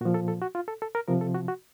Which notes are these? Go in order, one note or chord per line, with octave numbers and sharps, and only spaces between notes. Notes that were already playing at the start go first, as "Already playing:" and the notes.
A#2 F3 F#4
A4
A4
F#4
F4
A4
A4
A#4
C3 F3 A#4
A4
F#4
F#4